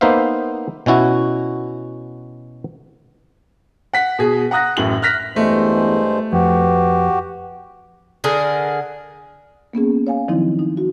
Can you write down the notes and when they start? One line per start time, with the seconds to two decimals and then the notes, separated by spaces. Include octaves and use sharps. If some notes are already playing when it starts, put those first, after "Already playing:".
0.01 A#3 B3 D#4 C5 E5 F5
0.86 B2 C#4 E4 F#4
3.93 F#5 B6
4.19 B2 G#4
4.51 F#5 A#5 D#6 F#6 A#6
4.77 A1 F#2 A2 F#7
5.02 F6 F#6 A#6 B6 F7
5.36 E2 G2 G#3 A3 C5
6.33 F2 F#4 G4 B4
8.24 D3 G#4 A#4
9.73 A#3 B3 C#4 G#4
10.07 C#5 F5 G#5
10.28 D#3 F3 F#3 C4 D#4 E4
10.59 D#4
10.77 F#4